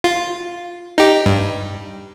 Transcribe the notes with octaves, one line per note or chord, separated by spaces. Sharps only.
F4
D#4 G4
G2